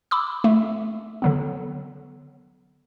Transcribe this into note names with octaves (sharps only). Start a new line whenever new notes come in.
B5 D6 E6
A3
D3 F#3 B3